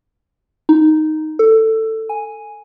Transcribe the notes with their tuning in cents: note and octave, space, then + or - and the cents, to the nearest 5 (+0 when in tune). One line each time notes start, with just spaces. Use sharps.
D#4 +0
A4 +15
G#5 +0